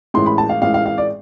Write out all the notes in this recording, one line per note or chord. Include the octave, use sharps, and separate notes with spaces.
A1 A2 G#3 C6
B5
A5
F5
A1 A2 G#3 F5
F5
F5
D5